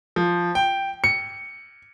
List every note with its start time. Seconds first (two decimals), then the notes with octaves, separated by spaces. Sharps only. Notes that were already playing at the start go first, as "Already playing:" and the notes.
0.16 F3
0.55 G5
1.04 C#7